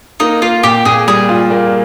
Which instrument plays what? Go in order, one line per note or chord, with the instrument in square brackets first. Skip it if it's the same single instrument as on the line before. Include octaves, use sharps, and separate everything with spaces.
[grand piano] A#3 [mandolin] D#4
[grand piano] A#3 [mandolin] F4
[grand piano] A#2 [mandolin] G4
[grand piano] A#2 [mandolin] G#4
[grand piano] G3 [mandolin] G#4
[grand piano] F4
A#3